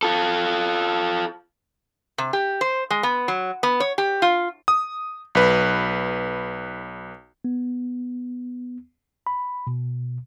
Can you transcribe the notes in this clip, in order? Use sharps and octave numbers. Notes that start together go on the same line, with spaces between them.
F4 A4
C3
G4
C5
G#3
B3
F#3
B3
C#5
G4
F4
D#6
B1 B4
B3
B5
B2